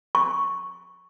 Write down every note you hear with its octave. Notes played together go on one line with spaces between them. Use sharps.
C#6